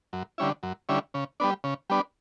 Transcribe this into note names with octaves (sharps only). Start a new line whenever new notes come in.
F#2
D3 G3 C#4 E4
F#2
D3 G3 C#4 E4
C#3
G3 B3 D4
C#3
G3 B3 D4